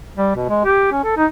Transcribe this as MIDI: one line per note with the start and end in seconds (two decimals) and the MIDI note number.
0.17 0.31 55
0.36 0.49 47
0.49 0.62 56
0.64 0.89 67
0.92 1.01 61
1.04 1.13 69
1.17 1.26 63